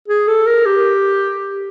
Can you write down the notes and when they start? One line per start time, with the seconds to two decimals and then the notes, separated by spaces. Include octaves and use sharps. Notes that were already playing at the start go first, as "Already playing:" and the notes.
0.08 G#4
0.28 A4
0.47 A#4
0.66 G4